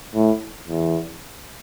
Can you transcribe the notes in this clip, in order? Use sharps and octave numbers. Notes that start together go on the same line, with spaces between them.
A2
E2